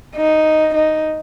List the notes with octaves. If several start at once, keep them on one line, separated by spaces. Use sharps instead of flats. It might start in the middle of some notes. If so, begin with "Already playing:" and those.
D#4
D#4